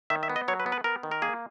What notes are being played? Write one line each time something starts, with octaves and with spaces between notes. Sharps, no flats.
D#3 E5
E5
B3
D#5
F#3 C#5
B4
B3
B4
B3 A#4
D#3
A#4
A#3 G#4